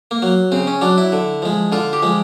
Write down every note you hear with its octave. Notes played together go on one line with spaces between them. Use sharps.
A#3
F#3
C#3 C4
C#4
F#3 D4
E4
D3
F3 G#3
D3 F4
G4
F3 G#3